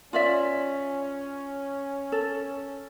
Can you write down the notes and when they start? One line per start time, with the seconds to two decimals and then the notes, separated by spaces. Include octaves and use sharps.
0.13 C#4 F4 D5 E5
2.12 A4